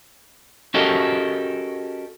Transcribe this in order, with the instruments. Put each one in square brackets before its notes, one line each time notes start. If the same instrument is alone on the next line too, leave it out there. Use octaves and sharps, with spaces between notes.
[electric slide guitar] C#4 F#4 G4 A4 A#4 D#5